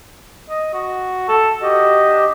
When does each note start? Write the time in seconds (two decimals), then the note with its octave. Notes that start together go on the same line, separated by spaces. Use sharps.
0.50 D#5
0.74 F#4
1.29 A4
1.62 F#4 G4 D#5
2.09 D4